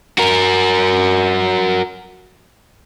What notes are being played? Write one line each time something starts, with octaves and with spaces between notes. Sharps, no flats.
F#4 A#4